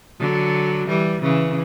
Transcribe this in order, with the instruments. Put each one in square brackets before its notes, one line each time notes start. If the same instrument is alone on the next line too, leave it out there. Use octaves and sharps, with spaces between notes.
[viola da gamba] D3 F#3
E3 G3
C#3 E3